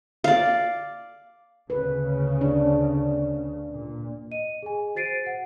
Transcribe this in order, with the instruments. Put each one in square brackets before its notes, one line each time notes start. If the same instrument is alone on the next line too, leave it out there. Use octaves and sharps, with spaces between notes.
[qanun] D5 F5
[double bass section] D2 C#3 [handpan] B4
[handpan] D4
[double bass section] A#2
[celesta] D#5 D#7
G#4 G#5
F#4 C5 A6 C7 D7 D#7
F#5